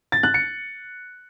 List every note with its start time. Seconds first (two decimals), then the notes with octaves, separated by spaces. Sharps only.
0.12 A6
0.23 F#6
0.34 C#7